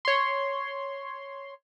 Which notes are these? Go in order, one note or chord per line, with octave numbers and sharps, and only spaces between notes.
C#5 C6